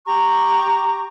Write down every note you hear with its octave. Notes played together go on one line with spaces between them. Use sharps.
G4 A#5 C#6 D6